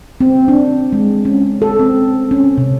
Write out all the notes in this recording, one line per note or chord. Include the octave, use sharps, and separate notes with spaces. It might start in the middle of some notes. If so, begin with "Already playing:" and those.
C4
D4
G#3
C#4
A4
C4
C#4
C3